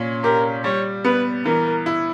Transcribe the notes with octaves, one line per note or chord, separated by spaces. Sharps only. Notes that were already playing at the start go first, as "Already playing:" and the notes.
Already playing: A#2 C#4
G4 A#4
G3 C#5
B3 B4
E3 A#4
E4